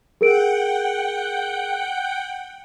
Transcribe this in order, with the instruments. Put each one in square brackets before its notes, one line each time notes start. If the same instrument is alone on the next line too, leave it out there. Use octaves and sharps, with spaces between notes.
[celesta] G#4 A#4 D7 [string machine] F#5 G5